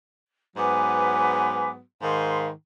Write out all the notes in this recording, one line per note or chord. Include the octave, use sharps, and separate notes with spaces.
G#2 F#3 B3 B4 G#5 D6
G#2 D#3 F5 B5 C6